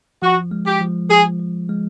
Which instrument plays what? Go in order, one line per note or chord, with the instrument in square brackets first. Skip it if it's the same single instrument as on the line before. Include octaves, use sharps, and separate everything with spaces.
[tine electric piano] F3 [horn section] F#4
[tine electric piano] G#3
[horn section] G4
[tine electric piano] F3
[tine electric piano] F3 [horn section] G#4
[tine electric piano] F3
G#3